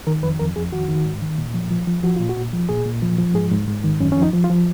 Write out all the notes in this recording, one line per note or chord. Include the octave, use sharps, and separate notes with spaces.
D#3 A#4
F2 B4
F2 A#4
F2 G#4
D#3 F#4
D#3
G#2
D#3
A#2
F3
F3
F3
F3 F#4
A#2 F4
F#4
A#2
F3
A#2 G#4
A#2
F3
F3
G#2 G#4
G#2
G#2
D#3
F#2 C#4
F3 C#4
D#4
F3
F4
F3